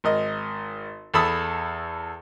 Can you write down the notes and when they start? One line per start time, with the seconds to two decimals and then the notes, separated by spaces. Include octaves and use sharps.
0.04 G#1 A#4 D#5
1.14 E2 A4 A5 B5 D#6 E6